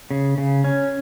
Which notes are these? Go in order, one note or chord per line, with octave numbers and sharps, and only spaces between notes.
C#3
C#3
C#4